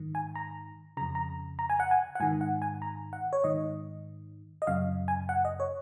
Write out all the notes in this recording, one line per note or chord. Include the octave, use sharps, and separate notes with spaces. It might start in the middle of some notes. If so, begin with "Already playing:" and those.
Already playing: G#2 D#3
G#5
A#5
F2 C#3 A#5
A#5
A#5
G#5
F#5
G#5
F#5
G#2 D#3 G#5
F#5
G#5
A#5
F#5
C#5
G#2 D#3 D#5
D#5
F#2 C#3 F5
G#5
F#5
D#5
C#5